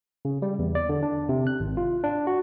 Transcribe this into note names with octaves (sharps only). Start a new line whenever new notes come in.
C#3
G3
E2
D5
D3
D4
C3
F#6
G#1
F4
D4
F#4